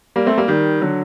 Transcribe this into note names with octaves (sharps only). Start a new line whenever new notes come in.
G3 A#3
A3 C4
G3 A#3
D#3 G3
D3 F#3